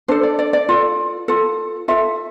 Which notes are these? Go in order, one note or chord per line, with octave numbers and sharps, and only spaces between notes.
D4 A4 C5
D5
D5
D5
F4 A4
F4 A4
F4 A4 E5